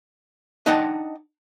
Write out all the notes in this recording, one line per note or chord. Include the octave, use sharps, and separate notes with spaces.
D4 D#4 D#5 F#5 G5 A5